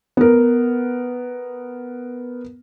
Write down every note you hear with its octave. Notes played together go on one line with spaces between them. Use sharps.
B3 A#4